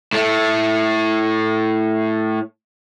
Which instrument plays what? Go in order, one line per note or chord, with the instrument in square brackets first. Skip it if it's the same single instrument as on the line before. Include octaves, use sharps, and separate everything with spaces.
[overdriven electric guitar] A2 A3